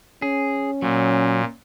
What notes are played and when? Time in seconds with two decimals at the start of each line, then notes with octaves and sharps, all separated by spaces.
0.22 C#4 G#4
0.82 A#2 F#3